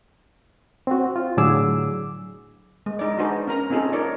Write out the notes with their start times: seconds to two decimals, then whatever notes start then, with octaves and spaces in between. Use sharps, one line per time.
0.87 C4 F#4
1.16 F4
1.37 A2 D3 F#3 G#4 D6 E6
2.86 G#3
2.99 D#4 D5
3.18 D4 D#4 F#4 G#4 B4 C5
3.48 C#4 A#4 A#5
3.70 C4 C#4 D#4 F4 G#4 A4
3.93 D#4 A#4 C#5 D5